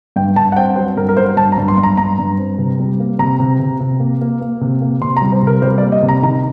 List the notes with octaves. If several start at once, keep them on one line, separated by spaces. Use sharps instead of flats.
G2 G5
G2 A5
F#5
C4 G5
F#3 C5
G2 A#4
A#4
F#3 C5
G2 A5
A#5
G2
C6
G2
A#5
G2 A#5
G2
C4
C3
G3
A#3
C3 A#5
C3
C3
C3
A#3
A#3
A#3
C3
A#3
C3 C6
A#5
G3
C5
C3 A#4
G3 C5
D5
A#3
D#5
C3
A#5
D#3 A#5